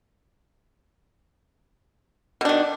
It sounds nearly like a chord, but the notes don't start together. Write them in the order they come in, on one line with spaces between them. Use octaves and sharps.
B2 D4 D#3